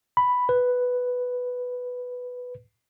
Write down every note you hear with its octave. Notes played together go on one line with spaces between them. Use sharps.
B5
B4